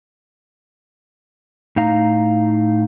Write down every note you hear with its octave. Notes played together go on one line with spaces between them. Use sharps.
A2 D#4 F5 A#5